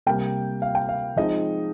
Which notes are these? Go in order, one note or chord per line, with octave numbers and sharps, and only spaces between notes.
C3 G3 A#3 G5
F5
G5
F5
F3 G#3 C4 D#4 D#5